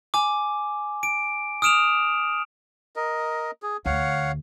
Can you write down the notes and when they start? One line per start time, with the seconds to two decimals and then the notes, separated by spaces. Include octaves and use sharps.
0.14 G#5 D6
1.03 D7
1.62 D#6 F6 D7 E7 F7
2.96 A#4 D#5
3.63 G#4
3.86 D2 C#5 F5 F#5